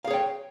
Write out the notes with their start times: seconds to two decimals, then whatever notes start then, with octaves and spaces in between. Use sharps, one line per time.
0.05 F5
0.07 G#4
0.10 C#5
0.13 G5